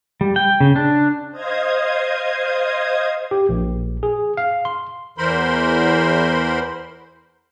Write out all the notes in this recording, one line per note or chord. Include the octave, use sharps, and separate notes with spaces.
G3
G5
C#3
D4
C5 D#5 F5 D#6 G#6
G4
A#1
G#4
F5
C6
E2 E3 A#4 C5 B5 C6